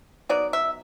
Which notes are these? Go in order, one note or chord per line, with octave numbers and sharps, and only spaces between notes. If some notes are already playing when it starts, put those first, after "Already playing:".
F#3 B3 D#4 D5
E5